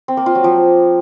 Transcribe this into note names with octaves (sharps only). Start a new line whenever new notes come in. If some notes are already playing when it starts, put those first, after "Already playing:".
C4
A#3
F4
F#3
F3